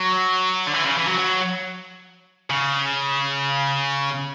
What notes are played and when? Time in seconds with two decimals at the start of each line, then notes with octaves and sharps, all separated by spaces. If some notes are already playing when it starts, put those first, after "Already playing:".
Already playing: F#3
0.67 D3
0.74 E3
0.85 C#3
0.97 E3
1.08 F#3
1.19 F#3
2.50 C#3